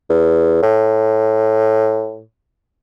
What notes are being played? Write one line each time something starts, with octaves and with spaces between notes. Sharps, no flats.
E2
A2